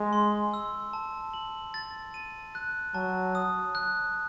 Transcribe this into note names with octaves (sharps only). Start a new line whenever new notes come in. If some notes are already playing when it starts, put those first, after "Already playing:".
Already playing: G#3
C6
E6
A5
F#7
A6
D#7
F#6
F#3 A5
D#6
F#6